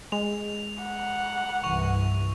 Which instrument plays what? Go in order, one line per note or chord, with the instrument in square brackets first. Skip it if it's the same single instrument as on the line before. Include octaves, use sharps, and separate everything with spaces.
[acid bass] G#3 [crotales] F7
[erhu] F#5
[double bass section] C2 G2 E3 [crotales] C#6 F7